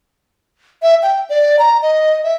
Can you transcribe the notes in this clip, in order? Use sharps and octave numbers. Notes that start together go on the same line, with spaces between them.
E5
G5
D5
A#5
D#5
E5